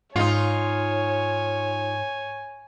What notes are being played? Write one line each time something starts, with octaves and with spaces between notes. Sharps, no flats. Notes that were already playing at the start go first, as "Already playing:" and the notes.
G#2 D#4 F4 C#5 G#5